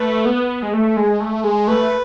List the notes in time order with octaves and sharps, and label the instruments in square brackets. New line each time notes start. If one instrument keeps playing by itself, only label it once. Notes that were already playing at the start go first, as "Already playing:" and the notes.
Already playing: [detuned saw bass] A3 [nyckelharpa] B4
[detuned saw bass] B3
G#3
A3
G#3
A3
G#3
[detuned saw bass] A3 [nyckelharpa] B4